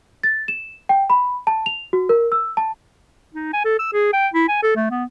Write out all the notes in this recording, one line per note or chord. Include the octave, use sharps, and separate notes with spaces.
A6
E7
G5
B5
A5
F7
F#4
A#4
E6
A5
D#4
G#5
A4
E6
G#4
G5
E4
G#5
A4
A3
B3